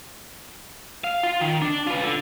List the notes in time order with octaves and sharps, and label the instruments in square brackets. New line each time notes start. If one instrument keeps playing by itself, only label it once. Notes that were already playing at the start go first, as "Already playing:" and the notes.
[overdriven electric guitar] F5
F4
D#3
D4
F4 B4
D3